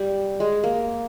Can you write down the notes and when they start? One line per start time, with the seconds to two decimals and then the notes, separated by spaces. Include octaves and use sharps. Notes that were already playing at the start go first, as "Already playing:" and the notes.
Already playing: G3
0.40 G#3
0.64 A#3